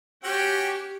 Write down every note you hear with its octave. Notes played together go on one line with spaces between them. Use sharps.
C#4 F#4 G4 G5